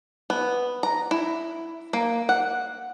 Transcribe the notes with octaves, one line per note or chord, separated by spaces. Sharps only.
B3
A#5
E4
A#3
F#5